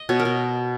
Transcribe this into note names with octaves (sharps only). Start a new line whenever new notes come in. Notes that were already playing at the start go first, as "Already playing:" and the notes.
Already playing: D#5
B2 C#5
A#4
B2